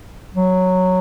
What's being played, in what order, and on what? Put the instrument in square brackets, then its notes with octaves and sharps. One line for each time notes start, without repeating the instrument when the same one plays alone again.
[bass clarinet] F#3